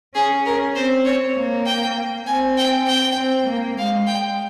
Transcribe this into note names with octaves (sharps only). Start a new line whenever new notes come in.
C#4 G#4
A#4
C4 C5
C#5
A#3
G5
C4 G#5
G5
G5
C4
A#3
G#3 F5
G5